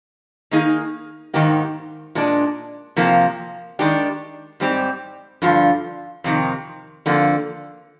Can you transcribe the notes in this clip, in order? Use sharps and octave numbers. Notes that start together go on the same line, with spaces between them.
D#3 A#3 D#4 G#4
G#2 D#3 A#3 D#4 G4
A#2 G#3 D4
F2 C3 F3 A#3
D#3 G#3 D4 G4
G#2 G3 C4 G4
G2 D3 F3 F4
F2 C3 D#3
F2 D3 F3 A#3